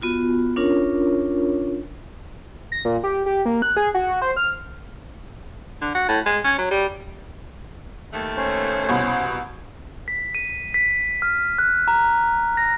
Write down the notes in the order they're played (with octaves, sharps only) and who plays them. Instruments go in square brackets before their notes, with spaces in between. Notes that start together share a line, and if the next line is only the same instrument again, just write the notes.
[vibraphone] B3 F4 F#4
C#4 D4 F4 A#4 C#5
[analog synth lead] A#6
A#2
G4
G4
A#3
F#6
G#4
F#4
C5
F6
[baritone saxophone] D3
F#4
A2
G#3
C#4
F#3
G3
[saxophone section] D#2 A3
[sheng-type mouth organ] C#4 C5 C#5
[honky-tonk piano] C2 B2
[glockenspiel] B6
D#7
B6
F6
F#6
A#5
A#6